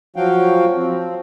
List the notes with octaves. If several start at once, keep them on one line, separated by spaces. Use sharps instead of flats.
F3 F#3 F#4 F5 G5
F3 C4